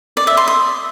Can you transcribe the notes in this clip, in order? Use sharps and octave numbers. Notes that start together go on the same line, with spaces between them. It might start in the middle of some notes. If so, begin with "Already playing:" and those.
D5
E5
C6
D#6